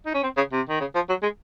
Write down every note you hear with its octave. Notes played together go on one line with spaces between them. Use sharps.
D#4
C#4
C4
C#3
C3
D#3
C#3
F3
F#3
G#3